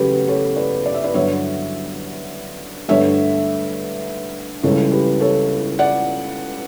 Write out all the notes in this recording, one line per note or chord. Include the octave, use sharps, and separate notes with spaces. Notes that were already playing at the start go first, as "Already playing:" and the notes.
Already playing: E2 C#3 F#3 A3 G4 B4
A4 C#5
B4 D5
D5
E5
B4 D5
G2 D3 F#3 C#5 E5
G2 D3 A3 C#5 E5
C#2 C#3 E3 G3 A4 C#5
G4 B4
A4 C#5
D5 F#5